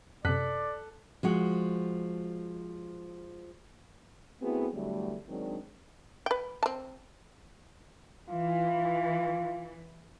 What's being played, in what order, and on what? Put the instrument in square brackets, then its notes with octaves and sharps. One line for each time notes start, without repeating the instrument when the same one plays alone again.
[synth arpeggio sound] F#2 C3 [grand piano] A4 F#6 B6 [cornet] D5
[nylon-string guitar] F3 G#3 F#4
[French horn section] A3 B3 C4 E4 F#4 G#4
E2 D3 F#3 G3 A3
D#3 F#3 G#3 C4 D4
[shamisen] B4 G5
C4 A5
[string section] E3 [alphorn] F4